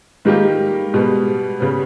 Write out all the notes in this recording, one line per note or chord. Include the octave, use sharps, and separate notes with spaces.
D#3 G3 G#3 A#3 D#4 G4
B2 G3 G#3 B3
C#3 G3 B3